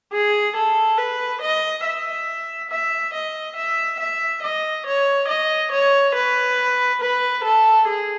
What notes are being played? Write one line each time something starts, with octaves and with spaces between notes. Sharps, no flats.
G#4
A4
B4
D#5
E5
E5
D#5
E5
E5
D#5
C#5
D#5
C#5
B4
B4
A4
G#4